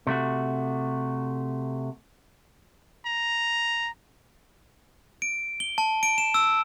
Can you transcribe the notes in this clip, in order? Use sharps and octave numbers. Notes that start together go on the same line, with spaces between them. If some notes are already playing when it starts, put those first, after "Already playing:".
C3 A3 F#4
A#5
D7
G7
A5
D7
E7
E6